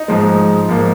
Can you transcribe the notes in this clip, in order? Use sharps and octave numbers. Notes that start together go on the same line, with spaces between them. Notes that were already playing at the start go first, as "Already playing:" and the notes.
Already playing: D#4
G#2 F3 G#3
G#2 F3 A#3